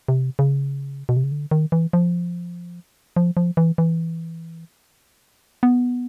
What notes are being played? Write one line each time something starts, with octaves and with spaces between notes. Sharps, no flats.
C3
C#3
B2
C3
C#3
D3
D#3
E3
F3
F3
F3
E3
E3
B3